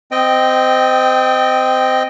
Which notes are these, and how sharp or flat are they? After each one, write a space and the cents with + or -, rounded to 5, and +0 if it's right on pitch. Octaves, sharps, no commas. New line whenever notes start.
C4 -20 D#5 +0 G5 +0